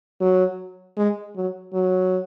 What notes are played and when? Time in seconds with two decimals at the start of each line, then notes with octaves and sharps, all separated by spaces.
0.21 F#3
0.97 G#3
1.36 F#3
1.73 F#3